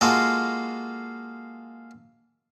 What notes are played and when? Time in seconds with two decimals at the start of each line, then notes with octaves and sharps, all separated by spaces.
0.01 G#3 A#3 F4 F#4 A4